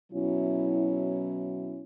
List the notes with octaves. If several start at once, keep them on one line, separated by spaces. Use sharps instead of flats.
B2 F#3 C#4 E4